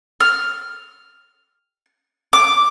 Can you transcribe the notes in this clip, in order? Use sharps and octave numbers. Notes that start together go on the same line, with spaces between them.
F6
D6